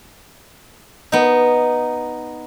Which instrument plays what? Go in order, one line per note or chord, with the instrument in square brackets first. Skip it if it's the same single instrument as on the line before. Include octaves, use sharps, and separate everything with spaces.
[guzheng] B3 D#4